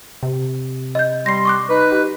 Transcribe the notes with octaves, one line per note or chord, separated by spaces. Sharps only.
C3
D#5 G6
G3 C6 A#6 C7
C#6 D6 F#6
D#4 B4
G4